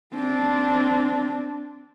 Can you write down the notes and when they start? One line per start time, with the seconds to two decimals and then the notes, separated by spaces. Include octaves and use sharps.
0.14 C4 D4